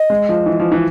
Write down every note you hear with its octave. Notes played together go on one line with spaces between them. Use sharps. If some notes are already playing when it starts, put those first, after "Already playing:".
Already playing: D#5
G#3
F3
E3
F3
E3